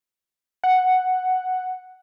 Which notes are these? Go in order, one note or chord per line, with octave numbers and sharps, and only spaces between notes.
F#5